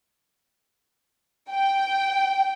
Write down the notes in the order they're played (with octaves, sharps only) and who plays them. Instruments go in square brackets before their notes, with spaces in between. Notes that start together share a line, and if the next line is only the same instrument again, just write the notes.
[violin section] G5